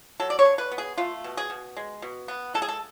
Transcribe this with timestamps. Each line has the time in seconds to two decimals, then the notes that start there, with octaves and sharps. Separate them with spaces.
0.20 F#3 A4
0.30 D5
0.39 C#5
0.45 D3
0.58 B4
0.72 B3
0.78 G#4
0.98 A3 F4
1.24 B2
1.37 G#4
1.50 B2
1.77 G#3
2.02 B2
2.28 B3
2.54 G#3 A4
2.62 G#4
2.68 A4